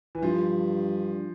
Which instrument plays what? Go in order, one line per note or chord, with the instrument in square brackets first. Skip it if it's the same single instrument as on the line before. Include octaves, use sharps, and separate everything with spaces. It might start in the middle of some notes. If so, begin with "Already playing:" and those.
[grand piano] E3
[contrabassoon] G2 [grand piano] F3